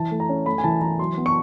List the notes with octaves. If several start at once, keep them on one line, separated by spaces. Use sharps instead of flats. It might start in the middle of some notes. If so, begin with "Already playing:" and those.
Already playing: E3 A5
A3
A#5
C#4
A3 B5
G#5
E3 A5
E3 A#5
F#3 C6
B3
C#6